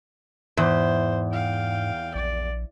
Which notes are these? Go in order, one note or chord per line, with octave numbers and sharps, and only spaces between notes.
E2 G#2 C5
F5 G5
A#1 D5